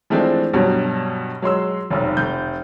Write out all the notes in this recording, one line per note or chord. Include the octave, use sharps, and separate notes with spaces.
E3 F3 G#3 A3 C4 D4
G2 B2 F#3 G3
F#3 G#3 C6 E6
F1 B1
F1 G6